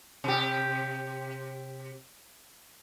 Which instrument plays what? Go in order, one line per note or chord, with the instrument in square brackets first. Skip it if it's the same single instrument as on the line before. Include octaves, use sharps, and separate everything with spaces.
[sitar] C3 G4